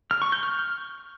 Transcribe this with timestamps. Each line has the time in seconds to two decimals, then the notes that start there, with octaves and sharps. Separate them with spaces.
0.11 F6
0.22 C#6
0.32 G6
0.43 F6